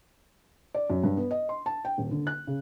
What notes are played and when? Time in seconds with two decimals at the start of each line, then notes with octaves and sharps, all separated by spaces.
0.75 D5
0.90 F#2
1.03 G2
1.17 B3
1.31 D#5
1.49 C6
1.66 A5
1.85 G5
1.98 D#1
2.11 D3
2.27 F#6
2.47 C#3